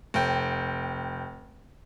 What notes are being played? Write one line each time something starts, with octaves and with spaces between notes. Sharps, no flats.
F1 G5